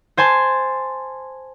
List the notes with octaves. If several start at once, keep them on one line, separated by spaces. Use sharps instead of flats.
C5 G#5 A5 C6